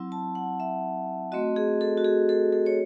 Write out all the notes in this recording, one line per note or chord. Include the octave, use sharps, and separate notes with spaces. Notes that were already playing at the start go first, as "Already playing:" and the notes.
Already playing: F#3 C4 E4
A5
F#5
E5
A3 C4 F#4 D#5
G#4
A4
F#4
G#4
A4
A4
C#5